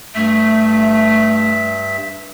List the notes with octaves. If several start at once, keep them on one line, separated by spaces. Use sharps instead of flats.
G2 A3 E5